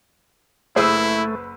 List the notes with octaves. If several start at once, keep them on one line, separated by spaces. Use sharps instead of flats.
F#1 A3 E4 G#4 B4 C5 E6